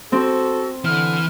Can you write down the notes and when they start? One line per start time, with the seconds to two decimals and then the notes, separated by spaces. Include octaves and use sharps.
0.12 C4 F#4 A4
0.85 D3 E3 F6